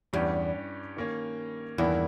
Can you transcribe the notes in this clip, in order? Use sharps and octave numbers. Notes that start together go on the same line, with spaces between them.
E2 G2 G3 C#4 G4
D#3 A#3 C#4
E2 G2 D#3 A#3 E4